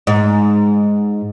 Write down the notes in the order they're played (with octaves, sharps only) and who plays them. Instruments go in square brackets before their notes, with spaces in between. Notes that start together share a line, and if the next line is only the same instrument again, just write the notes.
[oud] G#2